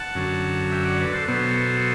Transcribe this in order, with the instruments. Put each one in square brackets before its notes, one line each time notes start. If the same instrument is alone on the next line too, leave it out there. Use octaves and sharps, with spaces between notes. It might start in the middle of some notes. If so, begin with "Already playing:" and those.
Already playing: [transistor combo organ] F#5 A5
F#2 D3 F#3
E5 G5
D5 F#5
B4 D5
A4 C5
B2 F#3 B3 A4 C5